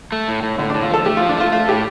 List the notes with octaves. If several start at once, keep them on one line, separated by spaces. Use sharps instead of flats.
A3
A2
A2
A2 D3
A2 D4
F4
F3 A4
A3 G4
F3 F4
D4
A3 F4
A3 F4
A2 G4